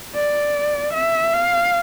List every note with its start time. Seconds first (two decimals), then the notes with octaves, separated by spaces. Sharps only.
0.16 D5
0.94 E5
1.34 F5